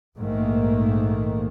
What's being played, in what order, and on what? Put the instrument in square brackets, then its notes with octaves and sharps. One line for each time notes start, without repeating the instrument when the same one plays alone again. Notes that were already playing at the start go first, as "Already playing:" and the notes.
[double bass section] A#1 G#2 D#3 A3 A#3